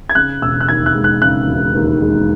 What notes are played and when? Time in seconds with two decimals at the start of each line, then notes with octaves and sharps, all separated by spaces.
0.10 G#6
0.15 C#3 F#6
0.42 E1 E6
0.61 F#6
0.68 D#2 G#6
0.86 F#6
0.94 G#3
1.04 F#6
1.22 C#3 F#6
1.48 E1
1.75 D#2
2.01 G#3